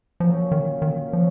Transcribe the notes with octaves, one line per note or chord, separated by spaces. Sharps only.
A#2 F3 F#3 C#4
D#3
D#3
F3 F#3 C#4